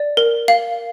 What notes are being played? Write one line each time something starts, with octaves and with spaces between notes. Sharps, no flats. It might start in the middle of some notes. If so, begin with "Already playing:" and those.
Already playing: D5
A#4
F5